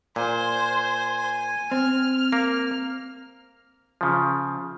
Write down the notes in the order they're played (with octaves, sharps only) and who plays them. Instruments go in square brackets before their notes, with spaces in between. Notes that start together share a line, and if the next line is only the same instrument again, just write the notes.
[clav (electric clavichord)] A#2 [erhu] C5 [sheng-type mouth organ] G#5
[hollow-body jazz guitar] C4 [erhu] F6
[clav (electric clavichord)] A#3
C#3 F3